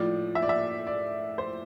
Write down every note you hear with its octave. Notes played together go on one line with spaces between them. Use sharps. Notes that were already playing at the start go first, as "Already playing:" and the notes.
Already playing: A2 F3 D5
E5
D5
E5
D5
C5